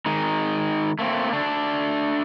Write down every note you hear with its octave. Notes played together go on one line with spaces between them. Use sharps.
D#3 G#3 D#4
A3 A#3 C4
A3 D4 A4